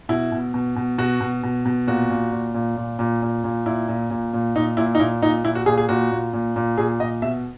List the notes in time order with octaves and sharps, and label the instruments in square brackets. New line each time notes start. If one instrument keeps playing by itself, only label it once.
[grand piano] B2 E4
B2
B2
B2
B2 F#4
B2
B2
B2
A#2 F#4
A#2
A#2
A#2
A#2
A#2
A#2
A#2
A#2 E4
A#2
A#2
A#2
A#2 D#4
A#2 E4
D#4
A#2 E4
A#2 D#4
A#2 E4
F#4
A#2 G#4
G#4
A#2 F#4
A#2
A#2
A#2
A#2 G#4
A#2 D#5
B2 E5